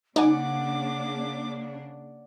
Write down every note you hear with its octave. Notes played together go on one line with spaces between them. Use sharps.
C#3 A#3 D4 D#4 D5 F#5 G#5 D6